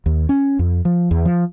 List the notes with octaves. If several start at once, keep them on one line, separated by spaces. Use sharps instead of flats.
D#2
C#4
F2
F3
E2
F3